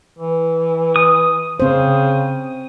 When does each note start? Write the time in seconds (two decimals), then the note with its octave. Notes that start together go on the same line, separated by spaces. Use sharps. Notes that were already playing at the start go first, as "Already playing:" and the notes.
0.19 E3
0.96 D#6
1.60 C#3 C4 C5